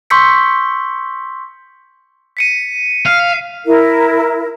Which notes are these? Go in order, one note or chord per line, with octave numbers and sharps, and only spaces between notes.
C6 C#6 E6 G6 B6 C#7
B6 C#7 D#7
F5
E4 A#4